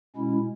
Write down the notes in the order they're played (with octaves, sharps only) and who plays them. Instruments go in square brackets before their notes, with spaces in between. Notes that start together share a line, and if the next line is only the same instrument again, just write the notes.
[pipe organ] B2 G#3 C#4 E4